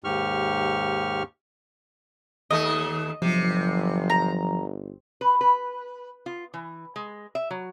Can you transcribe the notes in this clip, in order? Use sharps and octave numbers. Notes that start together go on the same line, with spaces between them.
D#2 G#2 G4 C#6 F6
D#2 A3 D#5
G1 C3 F3 F#3
A#5
B4
B4
F4
E3
G#3
E5
F#3